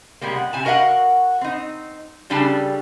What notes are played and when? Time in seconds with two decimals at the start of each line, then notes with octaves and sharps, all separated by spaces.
0.21 C3 G3 G#3 A#3
0.36 F#5
0.53 C3 G#5 A5
0.65 F#4 A#4 D#5 F5 F#5
1.41 C4 D#4
2.30 C#3 G3 D4 A4 G#5 A5